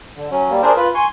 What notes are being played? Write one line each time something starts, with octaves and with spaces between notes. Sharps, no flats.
D3
F#3 C#4
G3 A#3
D4 G#4 A#4 C5
F4 B4
G#5 C6 C#6